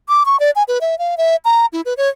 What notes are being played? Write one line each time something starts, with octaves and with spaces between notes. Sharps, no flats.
D6
C#6
D5
G#5
B4
E5
F5
E5
A#5
E4
B4
C#5